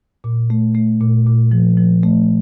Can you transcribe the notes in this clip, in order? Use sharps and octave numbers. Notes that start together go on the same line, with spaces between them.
A#2
A3
A3
A#2
A#2
F3
F3
A3